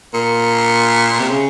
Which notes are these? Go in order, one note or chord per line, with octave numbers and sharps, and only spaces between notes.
A#2
C3
C#3